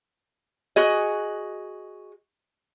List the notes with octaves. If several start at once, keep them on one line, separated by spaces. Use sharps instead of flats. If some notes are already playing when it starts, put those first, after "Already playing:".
F#4 G#4 D#5